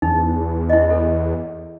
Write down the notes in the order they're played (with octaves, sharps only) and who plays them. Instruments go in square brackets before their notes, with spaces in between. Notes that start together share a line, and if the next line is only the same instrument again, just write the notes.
[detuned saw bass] E2 [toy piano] D#4
[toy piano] E4 D#5
A4